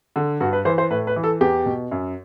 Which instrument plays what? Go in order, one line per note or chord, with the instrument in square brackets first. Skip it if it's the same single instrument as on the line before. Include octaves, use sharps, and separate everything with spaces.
[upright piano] D3
G2 F#4
B4
E3 C5
C5
A2 B4
B4
E3
A4
E2 G4
B2
F#2